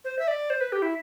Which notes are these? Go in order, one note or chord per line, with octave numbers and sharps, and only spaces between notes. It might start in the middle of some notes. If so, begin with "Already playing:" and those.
C5
E5
D5
C5
B4
G4
E4